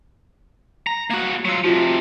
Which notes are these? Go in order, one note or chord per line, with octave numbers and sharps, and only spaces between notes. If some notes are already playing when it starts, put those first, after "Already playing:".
A#5
A#3 F#4 F#6 G#6
F#3 F4 E6 D#7
C3 F3 F4 F#4